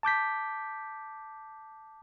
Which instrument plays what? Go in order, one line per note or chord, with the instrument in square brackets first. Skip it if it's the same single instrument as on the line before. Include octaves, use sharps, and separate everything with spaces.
[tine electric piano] A5 D6 G6 B6